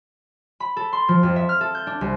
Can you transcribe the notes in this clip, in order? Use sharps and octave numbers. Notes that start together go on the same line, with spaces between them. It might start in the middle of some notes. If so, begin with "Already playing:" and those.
B5
A4
C6
F3
F2
E5
F6
A4
G6
D4
C2